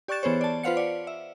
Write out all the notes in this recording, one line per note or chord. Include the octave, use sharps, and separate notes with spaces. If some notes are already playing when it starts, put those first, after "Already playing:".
G4 D5 C#6 F#6 A6 E7
E3 B3 G#4 C5 C#5
D5 A5
F4 B4 C5 F5 F#5 C#7
D5 F5
E5